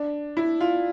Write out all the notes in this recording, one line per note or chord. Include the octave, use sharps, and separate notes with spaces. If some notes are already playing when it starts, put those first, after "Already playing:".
Already playing: D4
E4
F4